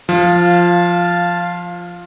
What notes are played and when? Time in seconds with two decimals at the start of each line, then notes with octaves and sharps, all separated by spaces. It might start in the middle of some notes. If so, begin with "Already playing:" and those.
0.09 F3 F5 A5